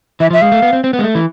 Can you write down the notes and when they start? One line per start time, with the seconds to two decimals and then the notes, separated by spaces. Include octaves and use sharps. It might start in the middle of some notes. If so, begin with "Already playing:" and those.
0.20 E3 E5
0.30 F3
0.33 E5
0.42 G#3 F5
0.52 A3
0.62 B3
0.73 C4
0.84 C4
0.93 B3
0.99 G#3
1.04 A3
1.15 E3